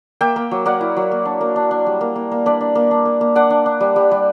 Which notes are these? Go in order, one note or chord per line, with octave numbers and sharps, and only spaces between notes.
A#3 E5 G5
A#3
F#3
A#3 D5 F#5
E4
F#3
A#3
D4
A#3
D4
D4
G3
A#3
A#3
A#3
D4 B4 D5
D4
A#3
D4
A#3
A#3
D4 D5 F#5
D4
D4
G3
G3
G3